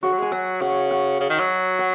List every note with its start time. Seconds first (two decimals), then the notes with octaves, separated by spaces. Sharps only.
0.03 C#3 F#4
0.12 F#3
0.18 G#3 G#5
0.31 F#3 F#5
0.61 C#3 F#5
0.91 F#5
1.20 C#3
1.30 D#3
1.39 F#3
1.79 F#5